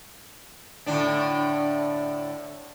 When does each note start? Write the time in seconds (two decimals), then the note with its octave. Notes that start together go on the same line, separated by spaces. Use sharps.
0.86 A2 D3 D4